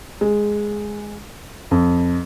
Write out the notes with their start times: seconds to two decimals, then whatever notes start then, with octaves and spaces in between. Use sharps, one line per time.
0.21 G#3
1.71 F2